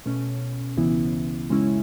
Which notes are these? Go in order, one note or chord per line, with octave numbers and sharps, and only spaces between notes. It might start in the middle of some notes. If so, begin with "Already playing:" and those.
B2 A3 C#4
C#2 C#3 E3 B3 E4
F#2 C#3 G#3 C#4 E4